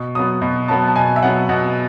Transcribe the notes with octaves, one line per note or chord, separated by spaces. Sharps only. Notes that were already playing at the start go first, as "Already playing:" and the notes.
Already playing: B2 C#6
F#3 B3 D#6
B2 B5
F#3 B3 A5
A5
B2 G#5
E5
F#3 B3 F#5
B2 F#5